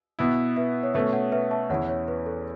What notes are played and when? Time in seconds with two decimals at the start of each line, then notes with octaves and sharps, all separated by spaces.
0.19 B2 B3 E4
0.56 B4 E5
0.83 C#5
0.94 B2 A3 C#4 B4 E5
1.13 C#5 F#5
1.32 B4 E5
1.51 E5 A5
1.69 E2 E3 C#4 E4 C#5 F#5
1.89 C#5
2.08 B4
2.26 A4